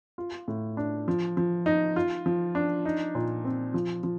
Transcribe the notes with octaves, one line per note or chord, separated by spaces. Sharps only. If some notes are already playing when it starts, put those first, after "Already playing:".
F4
A2
D4
F3
F3
D#4
F4
F3
D4
D#4
A#2
C4
F3
F3